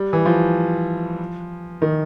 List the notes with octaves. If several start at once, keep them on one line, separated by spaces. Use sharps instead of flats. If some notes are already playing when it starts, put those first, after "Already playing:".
Already playing: G3
E3
F3
D#3